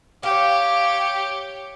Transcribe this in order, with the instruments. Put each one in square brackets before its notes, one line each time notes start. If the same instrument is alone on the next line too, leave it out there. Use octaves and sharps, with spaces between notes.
[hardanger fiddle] G4 C#5 [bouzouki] F5